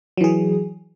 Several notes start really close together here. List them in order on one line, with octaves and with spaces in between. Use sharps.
F#3 E3 G#4